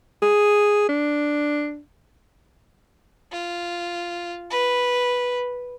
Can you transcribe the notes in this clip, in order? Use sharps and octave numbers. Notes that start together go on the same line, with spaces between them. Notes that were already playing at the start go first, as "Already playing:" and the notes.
G#4
D4
F4
B4